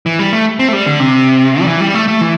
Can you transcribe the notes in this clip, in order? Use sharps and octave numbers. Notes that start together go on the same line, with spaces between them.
E3
G3
A3
C4
A3
G3
D3
C3
G3
E3
G3
A3
A3
E3